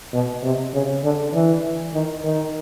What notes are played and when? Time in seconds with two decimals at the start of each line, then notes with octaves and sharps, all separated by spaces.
0.13 B2
0.43 C3
0.74 C#3
1.04 D3
1.34 E3
1.94 D#3
2.24 D#3